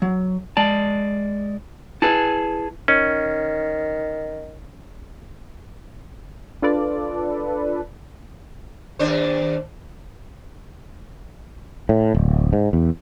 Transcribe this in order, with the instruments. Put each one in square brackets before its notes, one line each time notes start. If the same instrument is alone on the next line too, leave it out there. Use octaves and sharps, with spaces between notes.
[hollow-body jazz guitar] F#3
[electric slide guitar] G#3 D5 [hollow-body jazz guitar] A5
[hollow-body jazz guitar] E4 B4 [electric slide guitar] G#4 A5
[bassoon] D#3 [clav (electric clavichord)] C#4
[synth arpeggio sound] D4 F4 A4 B4 D5
[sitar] D#2 D4 C5
[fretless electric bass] A2
D1
G#2
E2